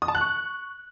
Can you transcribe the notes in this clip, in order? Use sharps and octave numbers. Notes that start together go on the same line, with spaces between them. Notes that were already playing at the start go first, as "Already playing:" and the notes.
D#6
A5
F#6
C#6